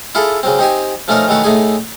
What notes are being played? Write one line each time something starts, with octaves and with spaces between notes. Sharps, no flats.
E4 F4 G#4 A4
C#3 F#3 C4
C4 D#4 G4 G#5
F3 A3 C#4 D#4 A#4
D#3 E3 F#3 A3 F#4
A2 A3 D#4 G#4 G#5